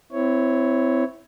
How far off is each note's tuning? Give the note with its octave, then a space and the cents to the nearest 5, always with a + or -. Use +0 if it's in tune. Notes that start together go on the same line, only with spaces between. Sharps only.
C4 -25 E4 +0 C#5 +0